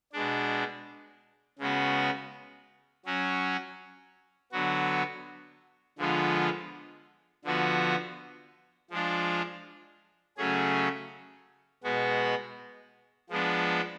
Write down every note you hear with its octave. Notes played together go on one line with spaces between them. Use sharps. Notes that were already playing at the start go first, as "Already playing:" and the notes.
B2 G#3 D4
C#3 G#3 B3 F#4
F#3 C#4 F#4
D3 F#3 B3 F#4
D3 F3 G#3 B3 F4
D3 F3 B3 F#4
F3 G#3 D4 F4
C#3 F#3 A3 C#4 G#4
B2 G#3 B3 F#4
F3 G#3 B3 D4